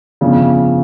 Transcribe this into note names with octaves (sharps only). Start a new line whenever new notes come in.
G1 F2 C#3